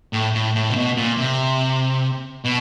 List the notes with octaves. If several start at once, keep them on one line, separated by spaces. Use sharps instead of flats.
A2
A2
A2
C3
B2
A#2
C3
B2